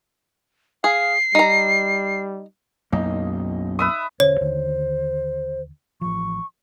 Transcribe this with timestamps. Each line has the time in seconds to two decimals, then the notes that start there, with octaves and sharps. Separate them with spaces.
0.84 G#4 F5 C7
1.35 G3 D#4 A#5
2.93 B1 F#2 A#3 D#4
3.79 B4 E5 D#6
4.20 E1 D3 C#4 C5 C#5
4.41 D#2 D3 D#3
6.01 A1 F3 C#6